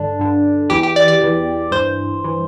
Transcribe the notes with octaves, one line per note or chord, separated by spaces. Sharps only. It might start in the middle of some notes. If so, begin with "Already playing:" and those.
Already playing: G2 D3 D4
G2 D3
E2 E3 G4
G4
D5
D5
E2 E3
G2 E3 C5
E3